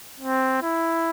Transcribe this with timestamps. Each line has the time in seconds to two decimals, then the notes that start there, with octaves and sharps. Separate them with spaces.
0.20 C4
0.63 E4